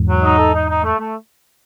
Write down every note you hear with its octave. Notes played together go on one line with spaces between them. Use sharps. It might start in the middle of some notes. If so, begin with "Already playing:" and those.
Already playing: E2 G#2
F#3
D#4
A4
D#4
D#4
A3
A3